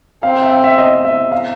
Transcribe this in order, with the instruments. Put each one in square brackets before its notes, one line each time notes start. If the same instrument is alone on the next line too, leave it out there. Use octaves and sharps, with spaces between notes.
[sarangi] C4 [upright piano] F5
[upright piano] E5
F5
E5
D#5
E5
F5